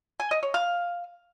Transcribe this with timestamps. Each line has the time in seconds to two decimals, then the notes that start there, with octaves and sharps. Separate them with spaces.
0.20 G#5
0.31 D#5
0.43 C#5
0.54 F5